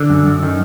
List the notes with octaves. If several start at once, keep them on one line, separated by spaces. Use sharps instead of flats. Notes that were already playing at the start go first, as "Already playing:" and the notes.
Already playing: D3
F#2
F#2
D#3